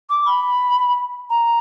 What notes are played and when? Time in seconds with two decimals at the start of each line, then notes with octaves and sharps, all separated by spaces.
0.09 D6
0.25 B5
1.29 A#5